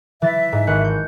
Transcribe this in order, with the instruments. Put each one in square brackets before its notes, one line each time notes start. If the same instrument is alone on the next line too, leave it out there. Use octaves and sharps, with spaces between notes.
[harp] E3 A6 [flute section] E5
[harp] G#2
G#1 F#6 C#7
G6